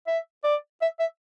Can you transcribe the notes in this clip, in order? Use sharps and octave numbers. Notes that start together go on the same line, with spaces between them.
E5
D5
E5
E5